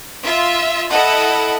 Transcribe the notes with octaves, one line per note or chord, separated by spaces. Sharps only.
F4 E5
E4 A4 D#5 F#5